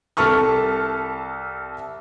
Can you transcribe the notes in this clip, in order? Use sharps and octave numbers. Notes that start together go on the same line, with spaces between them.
C2 A4 A5 C#6 F6